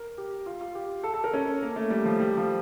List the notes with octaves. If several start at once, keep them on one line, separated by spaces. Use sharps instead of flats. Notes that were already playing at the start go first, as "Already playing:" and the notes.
Already playing: A#4
G4
F4
F4
G4
A4
A4
A#4
C#4
A#3
A3
G3
F3
G3
F3